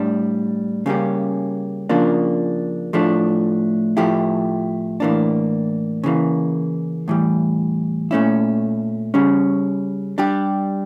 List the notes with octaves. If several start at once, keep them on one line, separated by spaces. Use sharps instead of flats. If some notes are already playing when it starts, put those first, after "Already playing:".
Already playing: A2 G3 D4
C#3 G3 A#3 C#4 G4
C#3 F3 A#3 D4
A2 F3 A3 D4
A2 F3 A3 E4 G4
A2 E3 A#3 D4
C#3 E3 A#3
A2 E3 G3
A#2 A3 C#4 E4
C#3 G3 C#4
G3 D4 G4